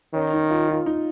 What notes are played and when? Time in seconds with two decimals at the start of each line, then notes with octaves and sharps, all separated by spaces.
0.14 D#3 C#4
0.33 D#4
0.51 F4
0.69 F4
0.86 D#4